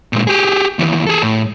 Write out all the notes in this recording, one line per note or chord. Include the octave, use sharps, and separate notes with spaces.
A#2 G#3
G4 G#4
D#2 E3
G#4 A4
A2